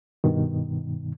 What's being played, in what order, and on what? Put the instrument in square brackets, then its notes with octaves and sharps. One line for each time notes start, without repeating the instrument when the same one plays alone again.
[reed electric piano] G2 B2 D#3